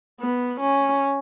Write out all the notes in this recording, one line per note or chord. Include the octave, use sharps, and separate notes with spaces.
B3
C#4